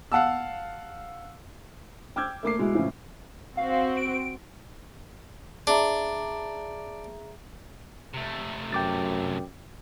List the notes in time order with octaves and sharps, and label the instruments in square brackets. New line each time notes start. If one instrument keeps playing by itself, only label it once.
[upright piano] F5 F#5 A5 E6
G5 D6 E6 F6 G6 G#6
A3 A#3 D6 C7
B2 G#3 E4
A2 C#3 E3 F3 C#4
[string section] C4 F#4 [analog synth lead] F5
[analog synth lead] D7
[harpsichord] D4 [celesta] G#4 E5 A#5
[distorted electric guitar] C3 A3
[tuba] F#2 [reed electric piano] G5 D6 A6